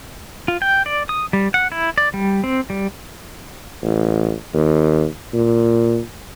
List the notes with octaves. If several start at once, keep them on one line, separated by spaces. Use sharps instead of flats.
F4
G5
D5
D#6
G3
F#5
E4
D5
G3
C4
G3
A1
D#2
A#2